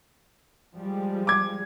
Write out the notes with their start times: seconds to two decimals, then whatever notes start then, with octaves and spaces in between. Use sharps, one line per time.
0.77 F3 G3 G#3
1.27 D6 G#6